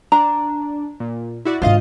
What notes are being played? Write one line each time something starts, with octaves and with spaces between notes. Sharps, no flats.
D4 A#5
A#2
E4 F#4 D5
G#2 D3 F4 C5 D#5 F5